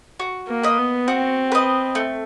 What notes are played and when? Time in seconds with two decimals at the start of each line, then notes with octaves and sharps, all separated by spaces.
0.20 F#4
0.48 A#3
0.63 B4 D#5
0.78 B3
1.08 C4 F#4
1.52 B4 D#5
1.95 A3